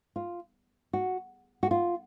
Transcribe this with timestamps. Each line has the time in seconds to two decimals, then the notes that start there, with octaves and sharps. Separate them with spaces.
0.16 F4
0.93 F#4
1.63 F#4
1.71 F4